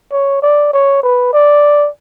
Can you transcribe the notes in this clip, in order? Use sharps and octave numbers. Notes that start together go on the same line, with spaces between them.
C#5
D5
C#5
B4
D5